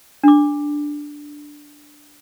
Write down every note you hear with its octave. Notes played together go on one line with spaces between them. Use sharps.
D4 D6